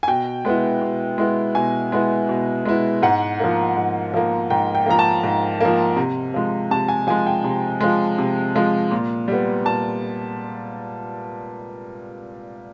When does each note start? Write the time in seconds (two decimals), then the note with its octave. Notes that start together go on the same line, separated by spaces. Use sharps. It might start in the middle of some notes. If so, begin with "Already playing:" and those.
0.03 G#5
0.08 B2 G5
0.45 G#3 B3 E4
0.82 B2
1.18 G#3 B3 E4
1.55 B2 G#5
1.92 G#3 B3 E4
2.29 B2
2.65 G#3 B3 E4
3.02 G#2 F#5
3.40 F3 A#3
3.77 G#2
4.14 F3 A#3
4.50 G#2 G5
4.75 G5
4.86 F3 A#3 A#5
4.99 A5
5.23 G#2
5.61 F3 A#3
5.96 C3
6.34 F3 G#3
6.71 C3 A5
6.88 G#5
7.07 F3 G#5
7.10 G#3
7.26 G5
7.44 C3
7.81 F3 G#3
8.18 C3
8.55 F3 G#3
8.91 A#2
9.28 G3 B3
9.65 A#2 A5